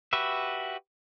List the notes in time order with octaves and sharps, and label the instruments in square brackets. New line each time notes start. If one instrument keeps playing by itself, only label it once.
[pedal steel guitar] F#4 G4 B4 E5